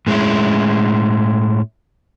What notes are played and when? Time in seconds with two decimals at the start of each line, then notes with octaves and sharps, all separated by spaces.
0.07 A2 G#3 C#4 E4